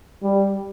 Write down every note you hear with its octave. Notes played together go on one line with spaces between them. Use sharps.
G3